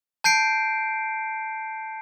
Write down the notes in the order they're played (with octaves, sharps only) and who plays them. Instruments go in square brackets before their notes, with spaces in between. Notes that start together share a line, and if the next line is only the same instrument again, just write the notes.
[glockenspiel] A5 G6 C7 D7